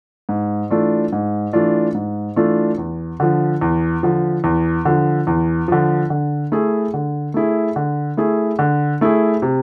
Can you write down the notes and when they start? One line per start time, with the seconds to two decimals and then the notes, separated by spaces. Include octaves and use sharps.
0.29 G#2
0.70 E3 A3 D4 F4
1.12 G#2
1.53 E3 A3 D4 F4
1.94 G#2
2.36 E3 A3 D4 F4
2.78 E2
3.20 D3 F3
3.61 E2
4.03 D3 F3
4.44 E2
4.85 D3 F3
5.27 E2
5.68 D3 F3
6.10 D3
6.52 A3 E4 G#4
6.94 D3
7.34 A3 E4 G#4
7.76 D3
8.17 A3 E4 G#4
8.59 D3
9.01 A3 E4 G#4
9.42 C3